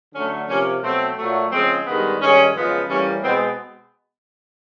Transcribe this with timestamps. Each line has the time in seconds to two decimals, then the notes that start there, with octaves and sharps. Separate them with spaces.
0.14 D3 F#3 A3 C#4
0.48 C3 F3 A#3 C#4
0.82 B2 F#3 A3 C4
1.17 A#2 F#3 A3
1.52 C#3 F3 G#3 C4
1.86 G2 D#3 G#3 B3
2.20 G2 D#3 G#3 C#4
2.54 F#2 C#3 F3 G#3 B3
2.89 A2 E3 G3 A#3 C#4
3.22 B2 G#3 B3 C4